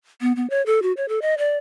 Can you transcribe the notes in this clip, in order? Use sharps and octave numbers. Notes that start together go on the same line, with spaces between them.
B3
B3
C#5
A4
F#4
C#5
A4
D#5
D5